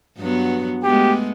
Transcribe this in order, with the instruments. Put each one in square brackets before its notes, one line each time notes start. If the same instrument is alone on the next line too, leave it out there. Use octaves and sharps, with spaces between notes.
[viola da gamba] G2 F#3 B3
[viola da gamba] G#3 A3 B3 [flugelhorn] G4